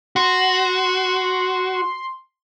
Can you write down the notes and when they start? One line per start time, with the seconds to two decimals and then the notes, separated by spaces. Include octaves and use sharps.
0.16 F#4 C6